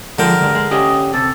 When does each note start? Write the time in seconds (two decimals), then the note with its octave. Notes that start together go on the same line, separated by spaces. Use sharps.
0.19 D3 F3 G#3 A#4 G5
0.41 D2 G2 G#3
0.55 G#3
0.71 C#4 G4 D#5
1.14 C3 A4